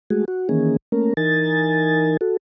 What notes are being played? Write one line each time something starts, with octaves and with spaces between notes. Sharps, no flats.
G#3 A3 F#4 G#4
F#4
D#3 E3 A#3 C#4 G#4
A3 A#3 C#4 A#4
E3 D#4 A#4 G#5 A6
F#4 A4